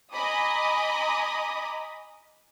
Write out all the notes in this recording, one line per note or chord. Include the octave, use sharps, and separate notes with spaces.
D#5 G#5 A#5 B5 D6 D#6